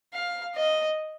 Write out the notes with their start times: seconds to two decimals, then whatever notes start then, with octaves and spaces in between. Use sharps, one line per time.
0.14 F5
0.55 D#5